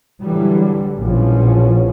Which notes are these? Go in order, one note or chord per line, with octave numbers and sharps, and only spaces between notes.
D3 E3 F#3 G3
A#1 B2 E3 F3 C#4